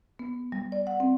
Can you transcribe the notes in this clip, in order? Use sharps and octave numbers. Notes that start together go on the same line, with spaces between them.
B3
G3
D5
F#5
C4